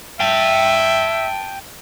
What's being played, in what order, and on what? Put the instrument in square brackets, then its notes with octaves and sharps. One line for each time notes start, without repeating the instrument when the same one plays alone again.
[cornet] E5 [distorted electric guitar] G5 A5